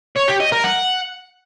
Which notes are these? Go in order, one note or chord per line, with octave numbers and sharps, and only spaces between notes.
C#5
G4
D#5
A#4
F#5